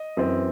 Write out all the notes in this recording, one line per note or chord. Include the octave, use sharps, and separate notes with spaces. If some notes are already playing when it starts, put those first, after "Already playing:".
Already playing: D#5
F#2 E3 C4